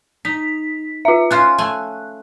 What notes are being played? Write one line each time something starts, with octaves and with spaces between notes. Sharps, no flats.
D#4 B6
F4 E5
C#4 F4 C5 F#6
A3 G#5